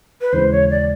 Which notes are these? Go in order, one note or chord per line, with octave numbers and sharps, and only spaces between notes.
B4
D#2 C#3 E3 G#3 C5
C#5
D5